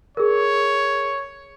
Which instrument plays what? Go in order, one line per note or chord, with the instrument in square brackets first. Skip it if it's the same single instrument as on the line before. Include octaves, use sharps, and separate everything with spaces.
[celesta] G#4 A#4 [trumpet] C#5